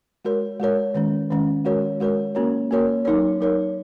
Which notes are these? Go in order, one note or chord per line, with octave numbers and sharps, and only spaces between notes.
G#3 F#4 A#4 C#5
G#3 F#4 A#4 C#5
D#3 G#3 C#4
D#3 G#3 C#4
G#3 F#4 A#4 C#5
G#3 F#4 A#4 C#5
A#3 C#4 F#4 A#4 C#5
A#3 C#4 F#4 A#4 C#5
F#3 D#4 A#4 C#5
F#3 D#4 A#4 C#5